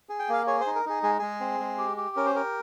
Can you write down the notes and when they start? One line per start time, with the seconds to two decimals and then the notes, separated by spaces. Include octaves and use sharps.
0.09 G#4
0.19 G5
0.29 A#3 F5
0.47 G#4 C#5
0.61 C5
0.67 D#4
0.75 A#4
0.85 D#4 G#4
1.03 G#3 G#4
1.19 G#3 G#4
1.40 C4
1.60 G#3
1.78 G4
1.97 G4
2.16 C#4 A#4
2.26 C5
2.34 G4 A#4